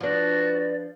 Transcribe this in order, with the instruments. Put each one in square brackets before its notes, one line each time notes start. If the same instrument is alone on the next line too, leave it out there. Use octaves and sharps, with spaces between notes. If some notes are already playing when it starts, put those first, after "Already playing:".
[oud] F3 D4 [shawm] F#4 [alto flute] B4 [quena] D5